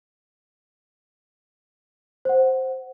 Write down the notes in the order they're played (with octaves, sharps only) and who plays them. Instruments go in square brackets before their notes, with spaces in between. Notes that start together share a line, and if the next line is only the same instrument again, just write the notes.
[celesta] C5 F#5